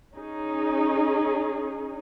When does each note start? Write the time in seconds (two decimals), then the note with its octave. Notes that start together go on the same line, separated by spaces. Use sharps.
0.15 C#4 D#4 G#4